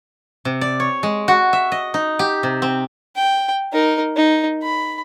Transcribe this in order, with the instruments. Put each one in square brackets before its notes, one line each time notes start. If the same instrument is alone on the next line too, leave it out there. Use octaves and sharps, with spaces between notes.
[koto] C3
D5
C#5
G#3
F#4
E5
D#5
D#4
G4
C3
C4
[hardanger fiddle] G5
D#4 A#4
D#4
B5